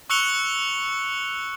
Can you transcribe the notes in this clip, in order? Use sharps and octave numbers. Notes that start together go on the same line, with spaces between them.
C#6 E6 F#6 C#7 F7 G7